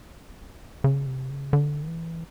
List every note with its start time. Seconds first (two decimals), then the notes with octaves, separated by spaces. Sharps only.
0.84 C#3
1.07 C3
1.30 C#3
1.53 D3
1.82 D#3
1.88 E3